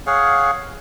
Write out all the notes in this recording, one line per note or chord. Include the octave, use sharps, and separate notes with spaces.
G#4 C#5 F5 F#5